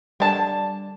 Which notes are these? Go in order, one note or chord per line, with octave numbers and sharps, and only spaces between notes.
D3 G3 D5 A5